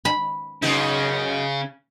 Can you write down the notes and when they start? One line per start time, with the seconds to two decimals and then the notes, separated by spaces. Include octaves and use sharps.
0.05 B5
0.62 F#2 C#3 B3 D#4